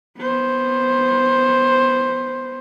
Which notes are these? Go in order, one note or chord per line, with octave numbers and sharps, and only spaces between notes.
B3 C5